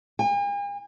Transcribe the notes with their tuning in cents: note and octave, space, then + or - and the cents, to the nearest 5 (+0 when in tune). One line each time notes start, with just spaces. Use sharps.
G#5 -45